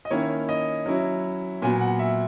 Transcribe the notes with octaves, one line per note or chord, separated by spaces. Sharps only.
D#5
D#3 A#3 C#4 E4 C#5
D#5
F#3 C#4 E4
A#2 F#3 B3 G#5
F#5
E5